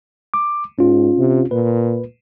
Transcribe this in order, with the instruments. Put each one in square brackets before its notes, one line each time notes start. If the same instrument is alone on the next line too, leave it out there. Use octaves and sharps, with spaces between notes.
[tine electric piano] D6
[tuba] G#2 [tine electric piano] C#4 F4
[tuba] C3
[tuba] A#2 [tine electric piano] B4